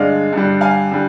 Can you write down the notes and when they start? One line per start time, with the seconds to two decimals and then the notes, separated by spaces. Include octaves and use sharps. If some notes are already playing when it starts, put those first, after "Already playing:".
Already playing: G2 D3 G#3 D5 F5
0.33 G2 D3 G3
0.61 F5 G#5
0.91 D3 G3